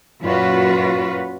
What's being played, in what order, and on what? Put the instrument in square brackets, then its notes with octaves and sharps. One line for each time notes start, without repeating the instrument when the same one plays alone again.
[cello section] F#2 A#2 F4 F#4 B4